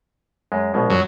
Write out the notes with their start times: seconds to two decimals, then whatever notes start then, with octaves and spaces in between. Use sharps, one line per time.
0.52 F#2 G#3
0.74 A#1 B2 G#3
0.90 F#2